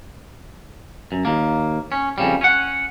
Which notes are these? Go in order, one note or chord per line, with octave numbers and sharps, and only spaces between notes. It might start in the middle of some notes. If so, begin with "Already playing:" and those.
F#2
D#2 A#3
C#4
F2 C#3 G3
C#4 F#5